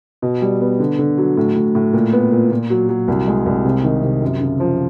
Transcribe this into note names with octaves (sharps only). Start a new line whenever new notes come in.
B2
G3
B3
D3
D3
F#3
A2
A2
A2
A#2
B3
A#2
A#2
F#3
F#3
C2
G#3
C2
C3
D#3
C3
F#2
C#3
F3